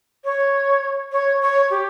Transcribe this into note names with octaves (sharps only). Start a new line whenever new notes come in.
C#5
C#5
C#5
G4